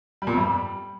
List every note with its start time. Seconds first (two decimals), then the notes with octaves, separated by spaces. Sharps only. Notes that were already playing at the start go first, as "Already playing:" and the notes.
0.22 G3
0.27 A#2
0.32 F2
0.37 G2
0.42 G3